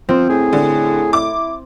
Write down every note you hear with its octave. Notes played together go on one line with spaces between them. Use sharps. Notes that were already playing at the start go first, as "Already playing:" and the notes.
F3 C4
A2 G#4
D3
E4 D6